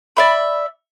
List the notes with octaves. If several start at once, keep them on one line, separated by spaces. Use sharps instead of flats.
D5 E5 B5